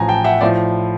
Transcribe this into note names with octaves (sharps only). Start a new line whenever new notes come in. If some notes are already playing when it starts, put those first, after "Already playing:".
Already playing: A1 A2 F3 G#5 A#5
G5 A5
E5 F#5
A2 F3 D5 E5